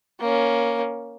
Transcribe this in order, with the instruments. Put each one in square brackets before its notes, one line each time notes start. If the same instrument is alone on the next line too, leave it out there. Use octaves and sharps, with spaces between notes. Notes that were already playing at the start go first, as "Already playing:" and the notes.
[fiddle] A#3 C#4